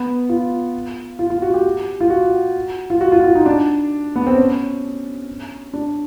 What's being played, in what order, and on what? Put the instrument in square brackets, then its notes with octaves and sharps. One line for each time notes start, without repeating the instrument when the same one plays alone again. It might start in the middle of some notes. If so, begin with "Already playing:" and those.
Already playing: [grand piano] B3
F4
F4
F4
F#4
G4
F4
F#4
F4
F#4
F4
F4
D#4
D4
B3
C4
C#4
D4